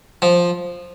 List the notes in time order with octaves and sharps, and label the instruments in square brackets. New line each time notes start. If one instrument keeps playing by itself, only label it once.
[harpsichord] F3